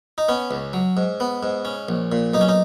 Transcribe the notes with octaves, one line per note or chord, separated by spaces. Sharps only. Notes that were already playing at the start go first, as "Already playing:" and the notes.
D#4
B3 C#4
C#2
F#3
G#2
B3
G#2
C#4
A#1
A#2
B1 D#4
C#4
D#4